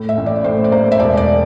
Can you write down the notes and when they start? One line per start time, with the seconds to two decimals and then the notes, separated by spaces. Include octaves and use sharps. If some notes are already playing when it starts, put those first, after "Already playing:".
Already playing: A2
0.09 E5
0.18 A1
0.26 D5
0.44 A2 C5
0.64 D5
0.72 A#3 C5
0.92 E5
0.99 E1 D5
1.17 D5